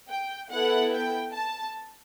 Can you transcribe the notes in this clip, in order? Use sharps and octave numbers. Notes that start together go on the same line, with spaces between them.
G5
B3 E4 A4 F#5
G5
A5